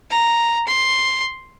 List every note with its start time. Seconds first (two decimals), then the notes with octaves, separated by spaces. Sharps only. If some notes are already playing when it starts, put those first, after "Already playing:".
0.11 A#5
0.67 C6